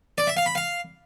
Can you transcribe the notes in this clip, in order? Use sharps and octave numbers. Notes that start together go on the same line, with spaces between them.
D5
E5
F5
B5
F5